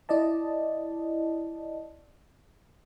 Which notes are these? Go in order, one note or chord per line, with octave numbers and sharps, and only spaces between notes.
E4 D5 D#5 A5